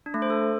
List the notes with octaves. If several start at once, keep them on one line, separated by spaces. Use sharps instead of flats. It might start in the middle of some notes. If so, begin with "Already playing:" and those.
D4
A3
C5
A4